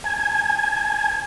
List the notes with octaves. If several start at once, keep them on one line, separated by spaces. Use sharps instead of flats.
G#5 A5 G#6